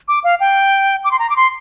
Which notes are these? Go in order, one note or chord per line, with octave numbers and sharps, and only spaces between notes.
D6
F5
G5
D6
C6
A#5
D6
C6